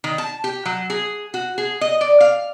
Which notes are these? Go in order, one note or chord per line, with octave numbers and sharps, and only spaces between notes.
D#3
A5
G4
F#3
G#4
F#4
G#4
D#5
D5
F5